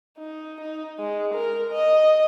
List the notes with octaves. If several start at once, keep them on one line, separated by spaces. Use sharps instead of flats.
D#4
D#4
G#3
A#4
D#5